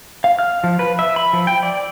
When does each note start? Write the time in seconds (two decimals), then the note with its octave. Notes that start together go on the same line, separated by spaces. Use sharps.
0.24 F5
0.39 F6
0.64 F3
0.79 B4
0.99 E5
1.16 B5
1.33 F3
1.47 G5
1.63 D5